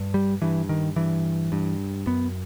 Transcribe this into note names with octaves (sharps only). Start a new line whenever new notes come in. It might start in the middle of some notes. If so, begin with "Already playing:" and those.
Already playing: G2
G3
G2 E3
D#3
G2 E3
G2
F#2 B3